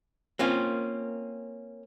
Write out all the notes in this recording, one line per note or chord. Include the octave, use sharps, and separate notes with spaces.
A#3 C4 C#4 F4